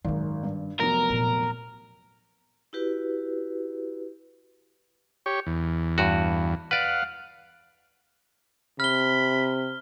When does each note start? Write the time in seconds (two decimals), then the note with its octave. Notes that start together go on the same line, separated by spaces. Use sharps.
0.05 G#1 F#2 D#3 C#4
0.43 G2
0.80 F1 F#3 B3 A#4
1.10 A#2
2.73 E4 F#4 G4 B4
5.26 G4 C#5
5.47 E2
5.98 G2 F#4
6.71 B4 D5 F5 F#5
8.80 C3 B5 F6 G7